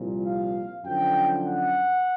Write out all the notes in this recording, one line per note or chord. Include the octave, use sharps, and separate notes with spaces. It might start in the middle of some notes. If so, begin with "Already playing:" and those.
Already playing: C2 A#2 F3
F5
F#2 D3 F3 G5
F#5